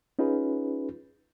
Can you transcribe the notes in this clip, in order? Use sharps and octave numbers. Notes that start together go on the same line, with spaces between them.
C#4 D#4 F4 G#4 B4